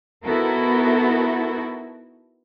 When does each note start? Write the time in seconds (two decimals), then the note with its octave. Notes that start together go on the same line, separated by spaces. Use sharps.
0.25 B3 D#4 E4 F#4 A4 A#4